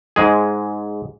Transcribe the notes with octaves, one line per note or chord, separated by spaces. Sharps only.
G#2 G#3 G#4